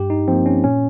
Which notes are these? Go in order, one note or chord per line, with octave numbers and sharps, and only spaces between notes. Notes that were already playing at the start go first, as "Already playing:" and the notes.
Already playing: G2 G4
D#4
F3 A#3 C4
C#4
A#2 C#4